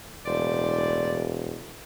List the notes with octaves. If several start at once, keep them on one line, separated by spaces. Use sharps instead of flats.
E1 A2 C5 D5